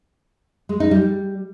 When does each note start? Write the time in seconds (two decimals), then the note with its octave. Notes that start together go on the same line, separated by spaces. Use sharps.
0.69 G#3
0.80 D#4
0.91 G3